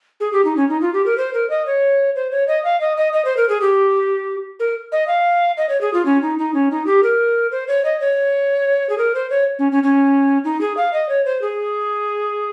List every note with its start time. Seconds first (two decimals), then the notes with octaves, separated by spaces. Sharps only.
0.20 G#4
0.33 G4
0.45 D#4
0.57 C#4
0.69 D#4
0.81 F4
0.93 G4
1.06 A#4
1.18 C5
1.34 A#4
1.50 D#5
1.66 C#5
2.16 C5
2.32 C#5
2.48 D#5
2.64 F5
2.81 D#5
2.97 D#5
3.13 D#5
3.25 C5
3.37 A#4
3.49 G#4
3.61 G4
4.60 A#4
4.92 D#5
5.08 F5
5.57 D#5
5.69 C#5
5.81 G#4
5.94 F4
6.05 C#4
6.22 D#4
6.39 D#4
6.54 C#4
6.71 D#4
6.86 G4
7.03 A#4
7.52 C5
7.68 C#5
7.85 D#5
8.01 C#5
8.90 G#4
8.98 A#4
9.15 C5
9.30 C#5
9.59 C#4
9.72 C#4
9.83 C#4
10.44 D#4
10.61 G#4
10.77 F5
10.93 D#5
11.09 C#5
11.25 C5
11.42 G#4